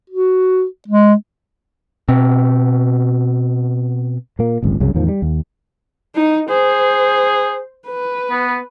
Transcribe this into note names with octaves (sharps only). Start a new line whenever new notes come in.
F#4
G#3
B2 C4
A#2 A#3
D1 G#1 C#2 G2
C2 F#2 C#3
E2 A2 D#3 F3
G3
D#2
D#4
G#4 C5
B4
B3